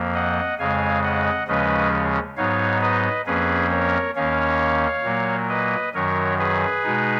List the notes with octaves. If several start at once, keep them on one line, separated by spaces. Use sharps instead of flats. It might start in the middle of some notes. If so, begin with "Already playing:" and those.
Already playing: F2 F3 A#3
D#5 F#5
F2 C#3 G#3 F5 G#5
D#5 F#5
D#2 C#3 F3 G#3 C#4 B4 D#5
G#2 F#3 B3 D#4 C#5 F5
B4 D#5
F2 F3 A#3 C#4 G#4 B4
A#4 C#5
D#2 D#3 A#3 C#4 C#5 F5
A#2 F#3 A#3
B4 D#5
F#2 D#3 F#3 A#4 C#5
G#4 B4
B2 G#3 D#4